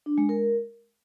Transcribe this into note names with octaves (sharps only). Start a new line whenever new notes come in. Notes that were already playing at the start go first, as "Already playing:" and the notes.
D4
G#3
A#4